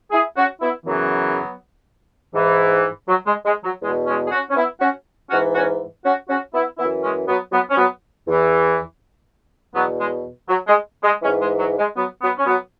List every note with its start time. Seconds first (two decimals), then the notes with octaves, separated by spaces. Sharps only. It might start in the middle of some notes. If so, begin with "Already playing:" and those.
0.12 E4 G#4
0.36 C#4 F#4
0.61 B3 E4
0.86 F#2 C#3 E3 F#3 B3
2.34 G#2 E3
3.08 F#3
3.26 G#3
3.45 G#3
3.64 F#3
3.82 E2 G#3
3.87 B2
4.07 G#3 C#4
4.26 G#4
4.31 C#4 F#4
4.50 C#4
4.56 B3 E4
4.80 C#4 F#4
5.30 G#2 E3 C#4 F#4
5.55 C#4 F#4
6.04 C#4 F#4
6.29 C#4 F#4
6.54 B3 E4
6.78 F#2 E3 B3 E4
7.03 G#3 C#4
7.28 F#3 B3
7.52 F#3 B3
7.70 C#4
7.77 F#3 B3
8.26 E2 E3
9.74 E2 B2 F#3 B3
9.99 G#3
10.48 F#3
10.68 G#3
11.04 G#3
11.22 E3 G#3 C#4
11.26 G#2
11.41 G#3
11.59 F#3
11.79 G#3
11.96 F#3 B3
12.22 F#3 B3
12.38 C#4
12.46 F#3 B3